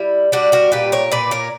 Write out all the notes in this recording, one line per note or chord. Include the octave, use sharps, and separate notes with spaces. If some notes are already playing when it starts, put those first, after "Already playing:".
Already playing: G3 E4
G3 D4 F#4
F#4 A#4
A#2 G4 B4
A#4 C#5
A#2 B4 D5
A#4 C#5